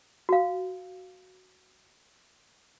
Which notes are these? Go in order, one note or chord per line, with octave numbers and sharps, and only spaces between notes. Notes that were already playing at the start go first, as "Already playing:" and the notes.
F#4 F5